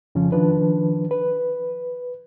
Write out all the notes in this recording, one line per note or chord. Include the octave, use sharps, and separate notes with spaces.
F2 C#3 F3 C#4
D#3 F3 D4 B4
B4